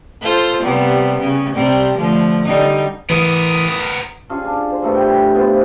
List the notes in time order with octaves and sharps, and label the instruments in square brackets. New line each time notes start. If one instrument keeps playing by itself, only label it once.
[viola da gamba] F4 A4 C5
C3 G3 B3
C#3
C3 G3 C4
D3 F3 A3
D3 G3 D#4
[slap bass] E3 [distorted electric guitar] B3 A#4 [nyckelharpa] D#6
[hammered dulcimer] C#4 D4 F4 G#4
D4
C5
G2 A3 B3
G5
B3 F4 C5